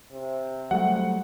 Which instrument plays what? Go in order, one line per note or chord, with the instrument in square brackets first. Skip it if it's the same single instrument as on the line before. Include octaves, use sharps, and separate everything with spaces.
[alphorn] C3
[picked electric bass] F#3 G3 A3 [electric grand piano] F#5